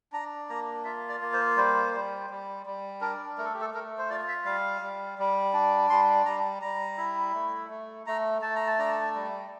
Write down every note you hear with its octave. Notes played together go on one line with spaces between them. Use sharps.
D4 A#5
A#3 A#5
F4 E5
D5
A#3
C5
G3 C5
G3
G3
G3
D4 A#4
A3 A#4
A4
G4
A4
A3 A#4
C5
F4 D5
E5
G3 F5
G3
G3
D4
G3 C6
G3 A#5
G3 A#5
E4
A3
A3
A3 A#5
A3 A5
A#5
A5
D4 A#5
A5
G3